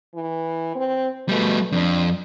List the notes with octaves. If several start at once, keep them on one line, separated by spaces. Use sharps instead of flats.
E3
C4
B2 G3 A3
F2 D4